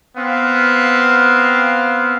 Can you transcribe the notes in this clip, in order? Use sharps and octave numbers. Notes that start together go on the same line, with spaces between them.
B3 C4 F5